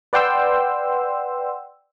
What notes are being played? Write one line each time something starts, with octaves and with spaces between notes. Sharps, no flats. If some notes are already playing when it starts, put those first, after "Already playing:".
B4 D5 F#5 G5 C6 E6